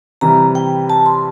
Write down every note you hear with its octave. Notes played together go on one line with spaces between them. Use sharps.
C3 E3 G3 A#5
G5
A5
C6